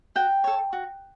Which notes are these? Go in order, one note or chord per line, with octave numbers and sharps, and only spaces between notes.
F#4 G5
A4 C#5
F#4